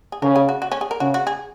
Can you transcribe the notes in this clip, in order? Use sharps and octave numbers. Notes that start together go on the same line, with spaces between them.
G#4
C#3 A#4
G#4
F#4
F#4
C#4
G#4
A#4
C#3 F#4
F#4
G#4